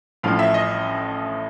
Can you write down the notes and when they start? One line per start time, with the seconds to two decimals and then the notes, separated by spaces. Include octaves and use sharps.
0.23 A1 A2 F3 F5
0.39 E5
0.54 D#5